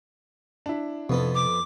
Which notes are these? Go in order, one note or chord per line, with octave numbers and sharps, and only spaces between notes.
D4 E4
F2 C3 B3 A4
D6